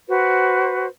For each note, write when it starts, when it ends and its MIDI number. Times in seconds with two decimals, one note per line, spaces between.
0.08 0.87 66
0.08 0.87 71
0.08 0.87 72